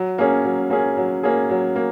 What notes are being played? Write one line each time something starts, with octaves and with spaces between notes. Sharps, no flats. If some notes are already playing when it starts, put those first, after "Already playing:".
Already playing: F#3
A#3 C#4 G#4
F#3
A#3 C#4 G#4
F#3
A#3 C#4 G#4
F#3
A#3